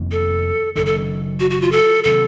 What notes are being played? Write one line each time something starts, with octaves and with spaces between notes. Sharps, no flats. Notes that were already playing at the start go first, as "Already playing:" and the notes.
Already playing: F1 F2 D#3 A#3
A4
F#1 F#2 D#3 A4
A4
F#4
F#4
F4
A4
C3 D#3 F#3 A4